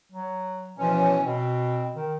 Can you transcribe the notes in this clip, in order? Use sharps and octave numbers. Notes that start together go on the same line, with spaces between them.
F#3
B2 E3 F3 C#4
B2 C4
D#3